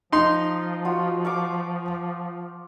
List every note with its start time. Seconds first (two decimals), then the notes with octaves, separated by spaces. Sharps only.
0.12 F3 D#4 C6
0.85 F4 F#4
1.25 F5 C#6 D6